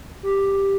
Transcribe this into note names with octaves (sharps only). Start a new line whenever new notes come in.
G4